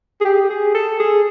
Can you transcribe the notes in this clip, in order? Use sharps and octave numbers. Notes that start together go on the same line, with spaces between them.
G#4
G4
G#4
A4
G#4